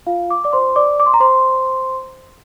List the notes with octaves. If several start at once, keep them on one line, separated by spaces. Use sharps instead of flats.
F4 F5
D6
D5 D6
C5 C6
D5 D6
D6
C6
A#5
C5 C6